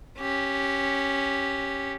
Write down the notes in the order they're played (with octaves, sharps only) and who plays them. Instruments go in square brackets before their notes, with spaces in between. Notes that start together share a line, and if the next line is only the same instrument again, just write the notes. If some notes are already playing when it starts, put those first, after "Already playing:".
[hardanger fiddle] C#4 G4